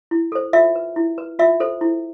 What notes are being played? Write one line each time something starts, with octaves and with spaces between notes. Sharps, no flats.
E4
A4 C5
F4 E5
B4
E4
B4
F4 E5
A4 C5
E4